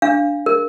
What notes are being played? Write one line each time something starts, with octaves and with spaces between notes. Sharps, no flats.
D4 F5
A#4